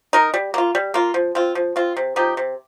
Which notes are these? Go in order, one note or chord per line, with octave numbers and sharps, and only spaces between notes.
D#4 A#4
G3
A#3 F4
G3
A#3 F4
F3
C4 F4
F3
C4 F4
C3
F3 D#4 G4
C3